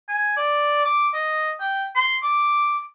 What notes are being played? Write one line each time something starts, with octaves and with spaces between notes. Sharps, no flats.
G#5
D5
D6
D#5
G5
C6
D6